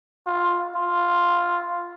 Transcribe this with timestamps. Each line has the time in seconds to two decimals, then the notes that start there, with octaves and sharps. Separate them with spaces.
0.26 F4
0.75 F4